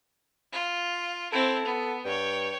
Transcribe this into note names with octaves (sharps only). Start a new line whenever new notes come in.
F4
C4 E4 A4
B3
G2 C#5 G5